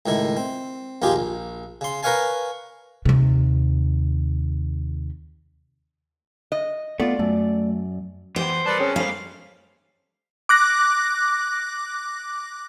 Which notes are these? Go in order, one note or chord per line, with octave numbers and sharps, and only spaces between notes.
C#2 A2 D#3 E4
C4
A#1 D#2 F4 G4 G#4
A#1
C#3 C6
A#4 B4 C#5 F5 G#5 A5
D#2 C3
D#5
A3 B3 F4 D5
F#2 A3
E3 B3 G4 C5 G5
G3 A#4 B4 D5 A5
C4 C#4 G#4 C#5
G3 G#3 A#3 A4 C5 F5
D6 F#6 A#6